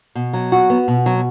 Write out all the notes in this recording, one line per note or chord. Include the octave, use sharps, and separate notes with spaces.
B2
F#3
F#4
B3
B2
F#3